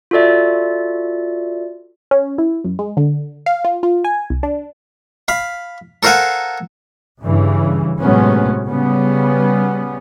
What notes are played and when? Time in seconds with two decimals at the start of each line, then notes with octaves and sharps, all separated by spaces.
0.11 F4 F#4 A4 D5 E5
2.11 C#4
2.38 E4
2.64 F#2
2.79 G#3
2.97 D3
3.46 F5
3.65 F4
3.83 F4
4.04 G#5
4.30 C2
4.43 D4
5.28 F5 B5
6.03 A4 A#4 C5 F5 F#5 G#5
7.21 G2 C#3 E3
7.99 A2 C3 F#3 G#3 B3 C#4
8.66 C#3 G3 B3 C#4